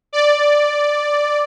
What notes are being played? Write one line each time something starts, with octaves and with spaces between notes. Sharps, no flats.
D5